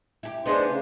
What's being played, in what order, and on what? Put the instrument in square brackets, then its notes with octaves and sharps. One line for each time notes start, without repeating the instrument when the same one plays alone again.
[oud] E4 G4
[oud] B3 D#4 G#4 [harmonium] D4 C5
[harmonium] C#3